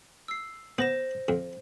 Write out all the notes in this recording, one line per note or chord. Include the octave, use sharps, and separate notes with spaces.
E6 C7
B3 C5 A#6 E7
F2